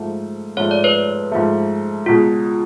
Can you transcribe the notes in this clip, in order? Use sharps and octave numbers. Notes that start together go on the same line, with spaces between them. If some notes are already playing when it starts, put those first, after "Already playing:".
Already playing: G#2 F3 A3
G#2 F3 A3 C#5
D5
B4 C#5
G#2 F3 A3
C#2 B2 G#3 F4